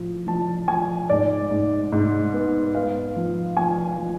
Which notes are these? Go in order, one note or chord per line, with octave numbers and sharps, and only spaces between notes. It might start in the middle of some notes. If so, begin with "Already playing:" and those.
Already playing: A2 F3
F3 A5
F3 G#5
G#2 D5
G#2
G#2
B3
B3 F5
F3
F3 G#5
F3